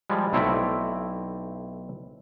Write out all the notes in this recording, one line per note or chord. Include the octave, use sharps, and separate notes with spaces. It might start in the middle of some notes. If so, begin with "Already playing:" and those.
F3 G3 G#3
B1 A3 C4 E4 D5 E5